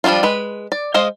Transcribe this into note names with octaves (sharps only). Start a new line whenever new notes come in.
F3 G3 A3 D4 F4
G#3 B4
D5
G#3 C5 D#5 F5